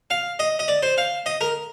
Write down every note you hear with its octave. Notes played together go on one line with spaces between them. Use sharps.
F5
D#5
D#5
D5
C5
F5
D#5
A#4